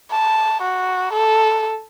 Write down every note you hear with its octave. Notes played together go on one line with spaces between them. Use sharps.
A5
F#4
A4